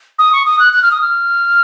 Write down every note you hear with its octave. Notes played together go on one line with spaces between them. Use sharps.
D#6
C#6
D#6
F#6
F#6
F6
D#6
F6